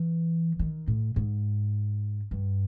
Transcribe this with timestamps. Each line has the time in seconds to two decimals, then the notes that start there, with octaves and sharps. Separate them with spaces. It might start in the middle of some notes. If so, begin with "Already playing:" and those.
Already playing: E3
0.59 D#3
0.87 A2
1.16 G#2
2.31 G2